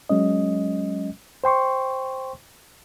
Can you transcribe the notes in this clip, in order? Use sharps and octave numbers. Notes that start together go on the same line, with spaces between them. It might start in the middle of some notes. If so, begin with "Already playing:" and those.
F#3 G#3 C#4 D#5
C5 G5 C6 C#6